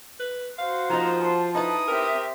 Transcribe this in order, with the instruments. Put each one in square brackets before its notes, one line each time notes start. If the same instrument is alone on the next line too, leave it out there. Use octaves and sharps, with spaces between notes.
[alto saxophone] B4
[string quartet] F#4 C5 [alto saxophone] F5
[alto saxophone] F3 [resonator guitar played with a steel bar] A#3 C4 D#4 [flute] A#5
[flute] C5 [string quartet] A5
[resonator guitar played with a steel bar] D#4 E4 B4 [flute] D#6
[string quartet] C4 G4 E5 [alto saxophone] A#4